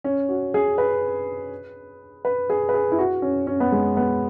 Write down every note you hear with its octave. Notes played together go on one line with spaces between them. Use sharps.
C#4
F#4
G#4
B4
B4
G#4
B4
G#4
E4
F#4
C#4
C#4
B3
G#3
B3